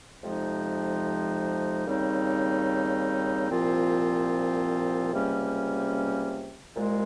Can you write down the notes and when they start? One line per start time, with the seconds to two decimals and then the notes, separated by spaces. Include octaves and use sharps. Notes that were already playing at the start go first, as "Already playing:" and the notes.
0.23 F2 C3 F3 G#3 D#4
1.86 D#2 C#3 G3 C4 D#4
3.49 C2 A#2 F3 C4 F4
5.12 C#2 C3 G3 A#3 C#4
6.75 C2 A#2 G#3